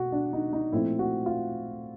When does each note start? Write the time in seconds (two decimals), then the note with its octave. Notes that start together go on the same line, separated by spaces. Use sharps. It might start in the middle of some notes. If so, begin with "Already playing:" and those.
Already playing: B2 F#4
0.12 D4
0.33 D#4
0.53 D#4
0.72 A#2 F3 A3 C4 E4
0.99 F#4
1.26 F4